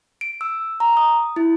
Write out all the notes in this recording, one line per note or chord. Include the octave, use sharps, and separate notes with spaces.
D7
E6
A#5
D#6
E4